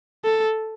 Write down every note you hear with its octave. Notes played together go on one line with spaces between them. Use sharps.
A4